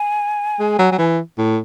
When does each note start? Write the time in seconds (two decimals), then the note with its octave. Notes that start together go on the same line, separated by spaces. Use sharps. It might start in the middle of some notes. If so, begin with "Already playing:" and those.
Already playing: G#5
0.60 G#3
0.79 F#3
0.92 F#3
0.99 E3
1.38 A2